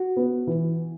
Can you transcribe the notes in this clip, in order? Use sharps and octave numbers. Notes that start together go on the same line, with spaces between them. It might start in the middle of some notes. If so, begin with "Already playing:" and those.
Already playing: F#4
B3
E3